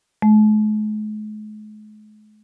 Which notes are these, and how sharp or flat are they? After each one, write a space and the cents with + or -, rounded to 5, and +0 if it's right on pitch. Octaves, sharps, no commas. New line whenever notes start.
G#3 +45